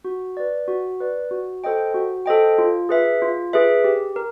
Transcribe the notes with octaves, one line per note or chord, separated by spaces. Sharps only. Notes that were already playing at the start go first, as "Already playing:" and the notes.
F#4
B4 D5
F#4
B4 D5
F#4
A4 C5 D#5 G5
F#4
A4 C5 D#5 G5
F4
G#4 B4 E5
F4
G#4 B4 E5
G4
A#4